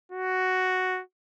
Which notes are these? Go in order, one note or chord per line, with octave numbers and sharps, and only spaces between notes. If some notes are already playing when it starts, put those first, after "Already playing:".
F#4